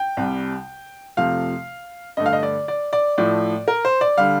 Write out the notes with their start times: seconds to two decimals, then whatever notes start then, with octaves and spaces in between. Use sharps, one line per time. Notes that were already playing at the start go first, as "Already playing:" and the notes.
Already playing: G5
0.17 C2 C3 G3
1.17 F2 C3 F3 A3 F5
2.17 G2 D3 A3 D#5
2.26 F5
2.33 D#5
2.43 D5
2.68 D5
2.93 D5
3.18 A2 F3 A3 D5
3.68 A#4
3.85 C5
4.01 D5
4.18 D3 G3 F5